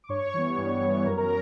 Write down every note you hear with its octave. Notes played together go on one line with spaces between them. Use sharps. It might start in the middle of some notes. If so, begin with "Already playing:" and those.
D6
G2 C#5 C#6
E3 G3 B3
G2
E3 G3 B3
F#2 A#4 A#5
A#4 A#5